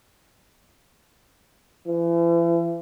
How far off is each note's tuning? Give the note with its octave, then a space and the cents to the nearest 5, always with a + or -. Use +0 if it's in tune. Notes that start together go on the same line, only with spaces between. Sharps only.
E3 +40